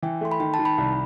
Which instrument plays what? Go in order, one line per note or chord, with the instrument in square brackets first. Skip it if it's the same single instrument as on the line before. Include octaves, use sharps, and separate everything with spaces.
[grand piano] E3 [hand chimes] G5
[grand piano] A3 [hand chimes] C6
[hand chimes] B5
[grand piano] D#3 [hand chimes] G5
[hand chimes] A5
[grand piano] D#3
[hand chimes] B5
[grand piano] C2